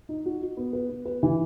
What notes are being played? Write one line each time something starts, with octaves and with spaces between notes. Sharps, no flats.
D#4
F#4
F#4
B3
B4
B3
B4
E3